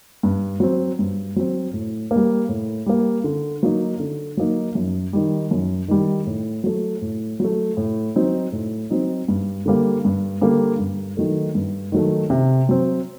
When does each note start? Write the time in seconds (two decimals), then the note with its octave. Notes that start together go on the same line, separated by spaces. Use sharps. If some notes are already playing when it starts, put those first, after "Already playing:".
0.23 G2
0.60 F#3 C4
0.99 G2
1.36 F#3 C4
1.73 A2
2.11 A#3
2.16 G3
2.49 A2
2.86 G3 A#3
3.24 D3
3.63 F#3 A#3 D#4
4.00 D3
4.37 F#3 A#3 D#4
4.75 F#2
5.13 D#3 G3
5.51 F#2
5.88 D#3 G3
6.27 A2
6.64 F#3 A3
7.01 A2
7.40 F#3 A3
7.77 A2
8.16 F#3 C4 D#4
8.52 A2
8.90 F#3 C4 D#4
9.28 G2
9.66 D3 G3 A#3
10.05 G2
10.41 D3 G3 A#3
10.79 G2
11.17 D#3 F#3 A3
11.55 G2
11.92 D#3 F#3 A3
12.30 C3
12.69 F#3 C4